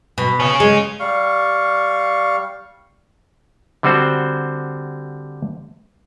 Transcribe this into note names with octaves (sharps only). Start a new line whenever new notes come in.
B2
C#4 G#4
G#3
G3 F5 C#6
D3 G3 C4 F#4 C5